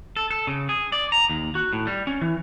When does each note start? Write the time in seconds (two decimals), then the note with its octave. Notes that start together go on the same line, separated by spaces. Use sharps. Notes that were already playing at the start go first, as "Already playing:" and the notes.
0.16 A4
0.31 A4
0.47 C#3
0.69 G#4
0.92 D5
1.12 A#5
1.30 D#2
1.55 F#4
1.73 A2
1.87 G3
2.07 C#4
2.21 E3